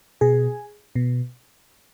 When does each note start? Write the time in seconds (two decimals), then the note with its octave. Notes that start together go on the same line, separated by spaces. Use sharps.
0.21 B2 G#4
0.95 B2